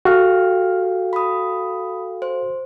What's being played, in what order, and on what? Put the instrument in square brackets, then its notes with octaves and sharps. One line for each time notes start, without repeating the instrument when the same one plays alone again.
[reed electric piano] F#4 [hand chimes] G4 F6 [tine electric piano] A4 F5 G5
[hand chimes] B5 D#6
C5